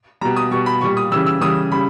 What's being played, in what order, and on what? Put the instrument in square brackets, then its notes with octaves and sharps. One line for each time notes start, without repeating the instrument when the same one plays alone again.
[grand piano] G3 A#5
B2
D#6
B2 G3 C#6
B5
A#2 G3 C#6
D#6
C#3 E3 G3 E6
E6
C#3 E3 G3 D#6
C#3 G3 B5